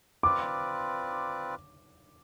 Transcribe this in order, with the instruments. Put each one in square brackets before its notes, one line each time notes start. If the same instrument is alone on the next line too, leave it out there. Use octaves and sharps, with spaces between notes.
[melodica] C4 F4 B4 D5 [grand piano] D6